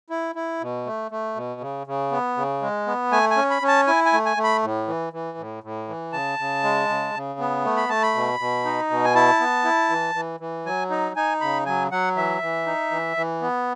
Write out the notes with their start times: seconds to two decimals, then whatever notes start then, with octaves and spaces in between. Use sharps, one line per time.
0.10 E4
0.35 E4
0.61 B2
0.86 A3
1.11 A3
1.36 B2
1.61 C#3
1.87 C#3
2.12 B3
2.37 C#3
2.62 G#3
2.87 B3
3.12 A3 G#5
3.30 G#5
3.36 C#4
3.50 B5
3.62 C#4
3.68 A5
3.87 E4 G#5
4.06 G#5
4.13 A3
4.26 G#5
4.37 A3
4.44 B5
4.62 A2
4.88 E3
5.13 E3
5.38 A2
5.63 A2
5.88 E3
6.13 C#3 A5
6.39 C#3
6.63 G#3
6.89 C#3
7.14 C#3
7.40 B3
7.65 A3
7.77 B5
7.89 A3 A5
8.02 B5
8.15 B2
8.40 B2
8.65 D#4
8.90 B2
9.05 G#5
9.15 E4 A5
9.40 B3
9.64 E4
9.90 E3
10.15 E3
10.40 E3
10.65 F#3 G#5
10.90 D#4
11.16 D#4 G#5
11.41 C#3 B5
11.66 F#3 G#5
11.91 F#3 F#5
12.16 E3 E5
12.42 E3
12.66 D#4
12.91 E3
13.17 E3
13.41 B3